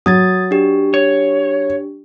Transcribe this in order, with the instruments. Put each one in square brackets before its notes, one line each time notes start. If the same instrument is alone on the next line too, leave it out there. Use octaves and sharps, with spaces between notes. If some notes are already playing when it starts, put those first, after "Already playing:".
[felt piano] F#3 [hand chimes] D#6 G#6 A6
[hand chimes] D4 G4
[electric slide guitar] C#5